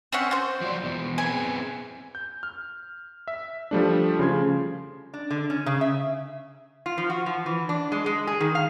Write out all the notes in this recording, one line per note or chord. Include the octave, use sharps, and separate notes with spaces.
C4 C#4 F#5
F#4 C5
F3 F#3 D5
E2 B2
B3 C4 G#4 G#5
G6
F6
E5
F3 G3 A3 D4
C#3 F3 C6 G#6
D4
D3
C#4
C#3
E5
F4
F3
F#4
F3
E3
D4
G#3
G#3
G#4
D#3
F5